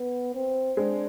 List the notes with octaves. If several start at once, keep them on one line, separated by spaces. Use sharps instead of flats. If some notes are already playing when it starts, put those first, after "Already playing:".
Already playing: B3
C4
G#3 C4 D4